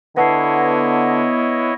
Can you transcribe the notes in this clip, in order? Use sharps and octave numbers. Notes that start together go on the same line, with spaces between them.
D3 B3 E4 C#5 D#5 F#5 A5 C7